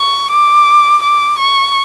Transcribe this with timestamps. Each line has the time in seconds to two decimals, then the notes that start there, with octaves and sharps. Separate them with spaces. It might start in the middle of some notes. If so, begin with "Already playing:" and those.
Already playing: C#6
0.30 D6
1.02 D6
1.38 C#6